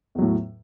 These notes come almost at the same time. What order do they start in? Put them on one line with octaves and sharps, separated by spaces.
E2 F#3 A2